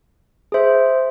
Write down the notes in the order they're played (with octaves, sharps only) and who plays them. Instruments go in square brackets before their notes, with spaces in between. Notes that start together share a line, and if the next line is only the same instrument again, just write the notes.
[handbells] G#4 C5 E5